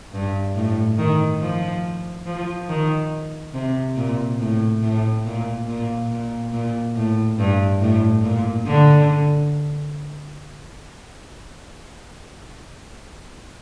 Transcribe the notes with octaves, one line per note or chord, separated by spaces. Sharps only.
G2
A2
D#3
F3
F3
D#3
C3
A#2
A2
A2
A#2
A#2
A#2
A#2
A2
G2
A2
A#2
D3